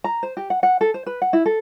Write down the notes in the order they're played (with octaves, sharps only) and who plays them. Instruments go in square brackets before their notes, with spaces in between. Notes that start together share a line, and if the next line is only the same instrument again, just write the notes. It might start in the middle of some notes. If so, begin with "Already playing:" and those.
[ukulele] A#5
C5
G4
F#5
F#5
A4
C5
B4
F#5
E4
A4